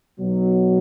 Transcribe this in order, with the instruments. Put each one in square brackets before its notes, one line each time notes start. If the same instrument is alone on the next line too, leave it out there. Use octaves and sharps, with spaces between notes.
[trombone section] B1 B2 F#3